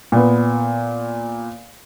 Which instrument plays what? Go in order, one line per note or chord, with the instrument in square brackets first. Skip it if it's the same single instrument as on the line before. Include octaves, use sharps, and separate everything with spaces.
[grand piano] A#2 B3